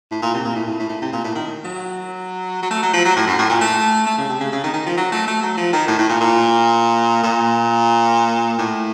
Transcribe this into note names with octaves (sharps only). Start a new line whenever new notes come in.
A2
A#2
C3
A#2
A2
A2
A2
A2
C3
A#2
A2
D#3
F#3
F#3
A3
F#3
F3
F#3
A2
F#2
A2
A#2
A3
A3
C#3
C3
C#3
C#3
D#3
D#3
F3
F#3
A3
A3
F#3
F3
D#3
A2
A2
A#2
A#2
A#2
A2